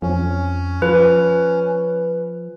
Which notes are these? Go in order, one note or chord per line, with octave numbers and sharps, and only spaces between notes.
F2 C#4
F3 B4